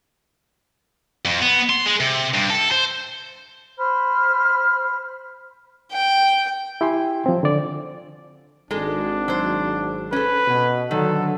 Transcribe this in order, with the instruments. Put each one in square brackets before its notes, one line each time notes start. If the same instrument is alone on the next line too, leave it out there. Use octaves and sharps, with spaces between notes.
[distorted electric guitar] F2
B3
C6
G#3
C3
G2
A4
C5
[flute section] C5 B5 F6
[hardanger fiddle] G5
[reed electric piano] E4 G4 G5 G#5 C6
F3 C4
D3 D5
[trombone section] G#1 [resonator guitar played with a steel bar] G#3 A4 [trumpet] D4
[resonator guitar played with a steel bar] F#3 C5
[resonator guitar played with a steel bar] C#4 A4 [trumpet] B4
[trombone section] B2
[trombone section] D3 F#3 [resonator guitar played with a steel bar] D#3 [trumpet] A4